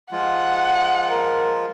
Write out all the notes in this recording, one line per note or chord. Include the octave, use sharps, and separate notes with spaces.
F3 G#3 F4 F#5
A#4